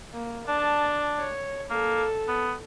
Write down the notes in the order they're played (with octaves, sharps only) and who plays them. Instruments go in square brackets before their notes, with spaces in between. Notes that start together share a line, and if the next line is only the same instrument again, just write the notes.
[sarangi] A#3
[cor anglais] D4 [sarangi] A5
[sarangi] C#5
[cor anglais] A#3 [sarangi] A4
[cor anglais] B3